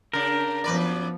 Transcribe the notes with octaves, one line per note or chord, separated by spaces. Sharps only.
C#3 D4 A#4
F#2 F3 B3 B4 D5